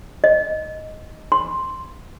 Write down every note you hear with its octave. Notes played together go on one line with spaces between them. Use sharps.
D#5
C6